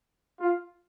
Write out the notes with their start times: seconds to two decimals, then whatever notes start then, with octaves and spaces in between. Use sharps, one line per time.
0.40 F4